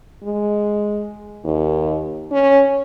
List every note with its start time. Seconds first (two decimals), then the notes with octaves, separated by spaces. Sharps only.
0.24 G#3
1.44 D#2
2.32 C#4